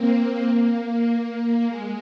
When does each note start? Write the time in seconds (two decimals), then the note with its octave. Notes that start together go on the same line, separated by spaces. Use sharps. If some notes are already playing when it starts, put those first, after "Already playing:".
Already playing: A#3 C4
0.47 A#3
1.68 G#3